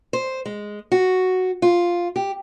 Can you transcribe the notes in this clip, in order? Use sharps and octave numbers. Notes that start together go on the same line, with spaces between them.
C5
G#3
F#4
F4
G4